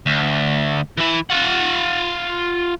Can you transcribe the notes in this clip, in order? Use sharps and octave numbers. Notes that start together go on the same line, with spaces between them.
D2
E3 E4
F4 F#5